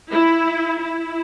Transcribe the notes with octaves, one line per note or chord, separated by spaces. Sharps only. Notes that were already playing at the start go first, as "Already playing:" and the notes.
E4
E4